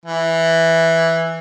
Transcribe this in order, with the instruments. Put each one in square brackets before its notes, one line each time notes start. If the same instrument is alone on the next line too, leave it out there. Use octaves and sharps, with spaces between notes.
[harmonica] E3